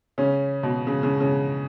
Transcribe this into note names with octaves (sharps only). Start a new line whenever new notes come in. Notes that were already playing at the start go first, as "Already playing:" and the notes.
C#3 C#4
B2
C#3
C#3
C#3